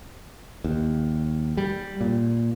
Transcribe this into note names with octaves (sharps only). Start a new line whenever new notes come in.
D#2
G3
A#2